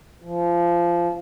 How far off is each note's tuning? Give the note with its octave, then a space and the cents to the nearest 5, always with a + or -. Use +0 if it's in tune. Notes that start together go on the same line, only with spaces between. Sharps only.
F3 -20